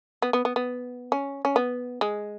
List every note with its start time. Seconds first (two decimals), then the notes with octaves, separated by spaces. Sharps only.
0.22 B3
0.33 B3
0.45 B3
0.56 B3
1.12 C#4
1.45 C#4
1.56 B3
2.01 G#3